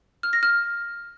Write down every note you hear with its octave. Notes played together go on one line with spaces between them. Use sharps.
F6
A#6
F6